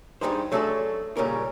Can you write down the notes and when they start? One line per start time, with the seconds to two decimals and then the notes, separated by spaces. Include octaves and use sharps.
0.21 G2 C3 G3 G#3 D#4 C5
0.52 F#3 A3 C#4 D4 G#4 A4
1.17 A#2 C#3 G3 C#4 A#4